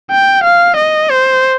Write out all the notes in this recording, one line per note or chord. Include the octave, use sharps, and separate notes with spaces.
G5
F5
D#5
C5